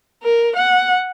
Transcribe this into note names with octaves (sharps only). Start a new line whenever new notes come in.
A#4
F#5